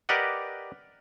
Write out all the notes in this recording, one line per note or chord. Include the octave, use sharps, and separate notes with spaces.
G4 A#4 B4 D5 D#5 F#5